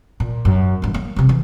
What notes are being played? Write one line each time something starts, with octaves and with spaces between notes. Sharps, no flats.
A#2
F#2
E2 G2
A#3
C3 F3
E3